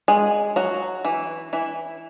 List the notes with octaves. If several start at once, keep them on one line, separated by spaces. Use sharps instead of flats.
G#3 G#4
F#3 F#4
E3 E4
E3 E4